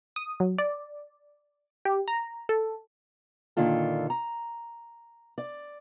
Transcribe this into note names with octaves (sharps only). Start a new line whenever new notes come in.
D#6
F#3
D5
G4
A#5
A4
A#2 D3 D#3 F4 A4
A#5
D5